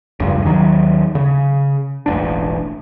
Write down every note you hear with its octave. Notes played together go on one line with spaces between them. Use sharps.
F1 C#2 G2
D#2 D#3 F#3
C#3
E1 A1 D4